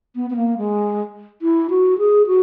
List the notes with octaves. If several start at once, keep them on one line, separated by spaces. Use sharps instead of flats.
B3
B3
A#3
G#3
E4
F#4
G#4
F#4